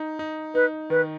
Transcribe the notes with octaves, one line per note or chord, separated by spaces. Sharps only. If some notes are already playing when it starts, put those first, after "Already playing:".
Already playing: D#4
D#4
D#4 B4
D#3 B4